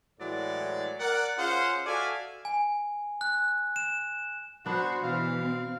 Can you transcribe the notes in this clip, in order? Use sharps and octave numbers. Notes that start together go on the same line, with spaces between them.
A2 E3 F#3 G#3 C#5 D5
A#4 D5 F#5
C#4 F4 G#4 C5 F5 F#5
F#4 A4 D5 E5 F5 G#5
G#5
F#6
E7
B3 D4 F#4 C5
B2 E3 F5
C4